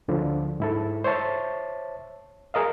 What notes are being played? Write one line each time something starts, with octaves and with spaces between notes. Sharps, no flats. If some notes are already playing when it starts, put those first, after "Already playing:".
D2 D3 F3
G#2 E4 A4
C5 C#5 E5 A5
G#4 A#4 D#5 F5